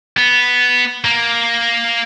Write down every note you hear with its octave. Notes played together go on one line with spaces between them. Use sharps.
B3
A#3